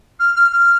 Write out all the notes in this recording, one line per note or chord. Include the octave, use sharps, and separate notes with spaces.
F6
F6
F6